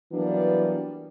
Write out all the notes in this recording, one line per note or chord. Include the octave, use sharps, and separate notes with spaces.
E3 F#3 G3 A#3 B3 D4